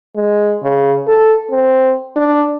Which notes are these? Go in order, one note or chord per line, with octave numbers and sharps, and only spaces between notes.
G#3
C#3
A4
C4
D4